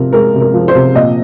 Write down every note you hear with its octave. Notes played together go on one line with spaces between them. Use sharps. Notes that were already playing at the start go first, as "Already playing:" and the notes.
Already playing: C3 F3 A#4
G#3 A#4
C3
A#4
F3
C5
C3
A#2 D#5